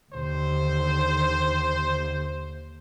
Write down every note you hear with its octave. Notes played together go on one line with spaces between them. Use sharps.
D#2 D3 C5